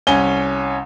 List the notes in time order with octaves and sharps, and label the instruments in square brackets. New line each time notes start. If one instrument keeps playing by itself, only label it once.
[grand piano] C2 C#4 G#5 G7